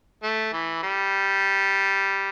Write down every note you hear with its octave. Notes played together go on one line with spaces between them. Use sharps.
A3
E3
G3